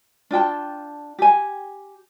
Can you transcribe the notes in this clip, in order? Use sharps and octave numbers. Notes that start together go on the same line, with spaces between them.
D4 F4 G5 A5
G4 G#5